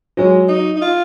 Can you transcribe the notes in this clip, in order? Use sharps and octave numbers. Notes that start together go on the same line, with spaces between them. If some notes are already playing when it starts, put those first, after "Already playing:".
F#3 G#3
D#4
D#4
F4